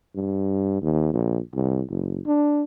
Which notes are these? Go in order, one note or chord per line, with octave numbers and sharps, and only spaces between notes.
G2
D#2
A#1
C2
F#1
D4